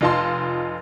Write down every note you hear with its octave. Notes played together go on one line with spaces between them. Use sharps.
F1 D#4 F4 D#5 A5 C6